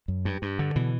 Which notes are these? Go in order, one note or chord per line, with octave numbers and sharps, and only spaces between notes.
F#2
G2
G2
D3
B2 E3